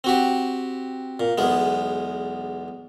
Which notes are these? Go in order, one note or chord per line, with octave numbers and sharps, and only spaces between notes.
C4 F#4 G4
A#2
B1 E2 G#3 B3